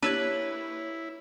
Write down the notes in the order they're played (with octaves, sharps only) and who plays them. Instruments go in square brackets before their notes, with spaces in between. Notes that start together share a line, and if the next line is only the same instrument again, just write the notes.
[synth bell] A#3 G4 C#5 [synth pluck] D4 E6 G#6 [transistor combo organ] E4 [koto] B4